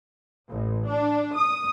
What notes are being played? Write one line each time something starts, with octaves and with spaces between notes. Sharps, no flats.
A1
D4
D#6